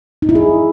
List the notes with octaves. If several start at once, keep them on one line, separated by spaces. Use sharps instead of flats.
D#4
E4
G#4